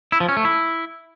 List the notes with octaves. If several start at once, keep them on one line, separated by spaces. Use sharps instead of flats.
E4
F3
C#4
A3
E4